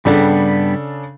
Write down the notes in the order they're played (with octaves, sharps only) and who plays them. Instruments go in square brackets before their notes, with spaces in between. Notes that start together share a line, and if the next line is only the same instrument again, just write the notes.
[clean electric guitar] G2 G3 B3 [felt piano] C#3 D4 A4